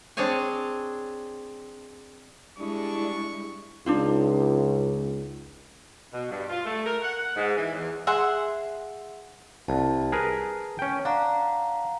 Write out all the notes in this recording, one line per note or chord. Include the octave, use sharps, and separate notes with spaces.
C4 D4 G#4 C#5 G#5
G3 G#3 D4 E4 C#6
C#2 D4 D#4 F4
B2
G2
F4
A3
A#4
F#5
F#5
G#2
E3
E2
G#4 E5 F#5 C6
C2 A5
G#4 A#4 B4
C#4 G5
D4 F5 F#5 A#5